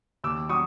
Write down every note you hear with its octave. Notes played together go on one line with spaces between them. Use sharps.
D#2 D6 E6
F#3 C#6 D#6